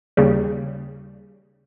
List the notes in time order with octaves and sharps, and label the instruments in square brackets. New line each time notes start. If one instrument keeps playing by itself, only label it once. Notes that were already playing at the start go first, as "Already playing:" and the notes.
[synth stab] D#2 C#3 G3